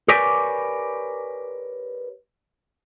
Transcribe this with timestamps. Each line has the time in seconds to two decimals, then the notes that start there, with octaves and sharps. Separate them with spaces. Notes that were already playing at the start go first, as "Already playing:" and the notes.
0.08 G4 A#4 B4 C#5 D5 G#5